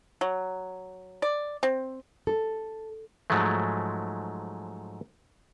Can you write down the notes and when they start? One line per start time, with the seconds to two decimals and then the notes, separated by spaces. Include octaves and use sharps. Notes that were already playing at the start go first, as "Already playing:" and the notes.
0.21 F#3
1.22 D5
1.63 C4
2.27 A4
3.30 G#2 F3 F#3 G#3 A3